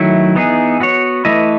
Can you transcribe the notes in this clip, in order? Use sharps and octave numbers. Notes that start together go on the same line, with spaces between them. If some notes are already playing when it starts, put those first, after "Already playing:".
Already playing: D#3 F#3 A3 E4
E3 B3 D#4 G#4
B3 F#4 C#5
E3 A3 E4 B4 D#5